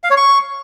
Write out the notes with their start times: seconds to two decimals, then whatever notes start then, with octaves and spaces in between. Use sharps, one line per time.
0.04 F5
0.10 C#5
0.17 C#6